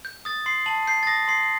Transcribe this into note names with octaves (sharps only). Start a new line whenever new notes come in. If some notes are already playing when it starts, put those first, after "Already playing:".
G6
D#6 A6
C6 C7
A5 F#7
G6 C7
A6
D#6 A#6
C6 C7